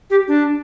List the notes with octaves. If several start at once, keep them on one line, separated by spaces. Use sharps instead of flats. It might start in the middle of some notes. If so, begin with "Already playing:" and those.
G4
D4